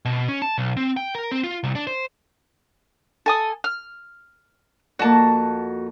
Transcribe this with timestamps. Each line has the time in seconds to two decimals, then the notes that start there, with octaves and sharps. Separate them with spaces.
0.05 B2
0.28 C#4
0.42 A5
0.58 B1
0.77 C4
0.97 G5
1.15 A#4
1.31 C4
1.44 F4
1.64 C2
1.75 D4
1.87 C5
3.26 A4 G#5 D#6
3.64 F6
4.99 F2 A#3 F#4 A5